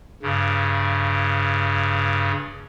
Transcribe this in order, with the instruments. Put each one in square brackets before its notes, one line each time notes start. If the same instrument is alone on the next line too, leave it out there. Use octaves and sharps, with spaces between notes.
[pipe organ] G2 C#3